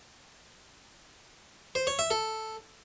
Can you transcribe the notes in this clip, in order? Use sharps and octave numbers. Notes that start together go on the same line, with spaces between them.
C5
C#5
E5
A4